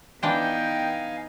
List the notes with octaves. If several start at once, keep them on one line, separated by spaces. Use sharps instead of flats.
E3 B3 D4 D#4 C5 F5 G5 G#5